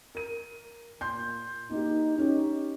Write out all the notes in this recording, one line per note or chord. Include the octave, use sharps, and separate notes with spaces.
A#4 D#7
A#2 C6 G6
A#3 D#4 G4
C#4 D#4 G4